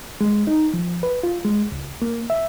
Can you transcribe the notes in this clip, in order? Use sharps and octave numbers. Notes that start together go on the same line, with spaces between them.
G#3
D#4
F3
B4
F4
G#3
C#2
A#3
E5